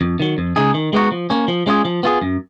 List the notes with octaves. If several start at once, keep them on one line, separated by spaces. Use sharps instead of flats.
F2
D#3 F#3
F2
C#3 G#3 D#4 G#4
D#3
G#3 B3 D#4 F#4
F3
A#3 C#4
F3
G#3 C#4 F4 G#4
F3
B3 F4 G#4
F#2